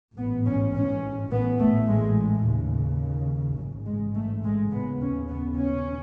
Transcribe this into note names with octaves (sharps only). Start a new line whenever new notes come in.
A1 G#2 B3
C#4
C#4
A1 A2 B3
A3
G#3
D#2 C#3
A1 G#2 F#3
G#3
A3
G#3
D#2 C#3 B3
C#4
B3
C#4